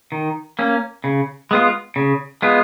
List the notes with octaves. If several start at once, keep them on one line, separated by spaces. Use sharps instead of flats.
D#3
A#3 C#4
C#3
G#3 B3 F4
C#3
G#3 B3 F4